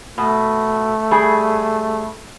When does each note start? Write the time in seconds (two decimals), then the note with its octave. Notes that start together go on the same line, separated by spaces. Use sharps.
0.18 B2 A3
1.11 G3 G#4